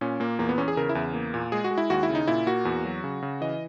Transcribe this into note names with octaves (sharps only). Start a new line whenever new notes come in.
A#2 C#4
A#2 A#3
E2 A#3
B3
E2 C#4
G#4
C#3 A#4
E4
E2
A#3
A#2
G#3 G#4
F#4
G#3
E4
D#2 F#4
E4
C#3
D#4
A#2 E4
A#3 F#4
E2
F#3
C#3
C#3
E3 D#5